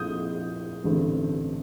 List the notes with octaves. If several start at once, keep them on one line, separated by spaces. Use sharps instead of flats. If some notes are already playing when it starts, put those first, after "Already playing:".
Already playing: A#1 A#2 F3 A3 C4 D#6 G6
A1 G2 D3 A3 C4